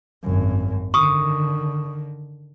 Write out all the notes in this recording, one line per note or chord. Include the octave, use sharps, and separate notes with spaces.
G#1 F#2
D3 D#3 C#6 D#6